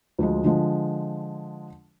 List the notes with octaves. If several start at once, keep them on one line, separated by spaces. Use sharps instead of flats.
D2 F3 G#3
D3 F3 G#3